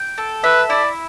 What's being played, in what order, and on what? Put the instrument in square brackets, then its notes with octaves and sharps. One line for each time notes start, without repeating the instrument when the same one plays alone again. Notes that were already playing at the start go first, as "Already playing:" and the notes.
Already playing: [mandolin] G5
A4
[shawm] B4 [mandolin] E5
[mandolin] E4 [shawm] D5